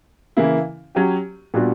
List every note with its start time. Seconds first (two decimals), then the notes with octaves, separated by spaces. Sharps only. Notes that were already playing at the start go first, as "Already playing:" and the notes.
0.37 C#3 E3 A#3 E4
0.95 F#3 C#4 G4
1.54 A#2 G3 B3 D4 F#4